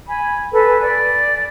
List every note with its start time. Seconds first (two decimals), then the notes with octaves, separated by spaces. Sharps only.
0.08 G#5 B5
0.51 A4 B4 G#5
0.80 D5